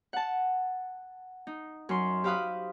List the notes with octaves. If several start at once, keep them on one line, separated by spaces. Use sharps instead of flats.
F#5 A5
D#4
F#2 C6
G4 C5 F5 B5 D#6 F#6